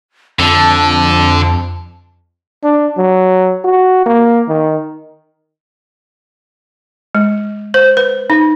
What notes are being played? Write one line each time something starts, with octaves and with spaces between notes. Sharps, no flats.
F2 D3 A5
D4
F#3
F#4
A#3
D#3
G#3
C5
B4
D#4